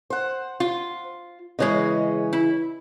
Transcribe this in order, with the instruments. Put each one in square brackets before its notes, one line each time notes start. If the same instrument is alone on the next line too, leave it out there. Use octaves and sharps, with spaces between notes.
[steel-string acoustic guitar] C5 F#5
[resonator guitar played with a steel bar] F4
[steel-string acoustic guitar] C#3 E3 C#4 [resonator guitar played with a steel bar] G#3 C#5 D#5
[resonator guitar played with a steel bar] E4